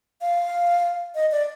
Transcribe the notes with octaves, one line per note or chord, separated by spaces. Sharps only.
F5
D#5
D5